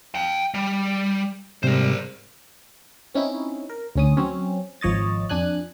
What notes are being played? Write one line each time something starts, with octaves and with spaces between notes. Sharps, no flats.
F5 G5
G3
G#2 C3 G3 A#4 C5
C4 C#4 D#4 E4
A#4
D2 C#4 D#6
F#3 C4 C#4
G#1 F3 C#5 D#5 A6
F2 D4 G#5 F#6